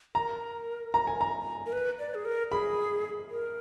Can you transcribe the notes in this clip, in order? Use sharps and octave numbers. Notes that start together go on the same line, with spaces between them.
A#4 A#5
A#5
G#5
A#5
A#4
B4
D5
G#4
A#4
G#4 B5
A#4